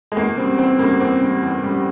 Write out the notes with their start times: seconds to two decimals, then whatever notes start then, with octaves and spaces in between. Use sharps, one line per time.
0.12 G#3
0.16 E2 A#3
0.37 C#3 G3 C4
0.58 E2 C4
0.79 C#3 G3 A#3
1.00 E2 C4
1.22 C#3 G3
1.43 E2
1.63 C#3 G3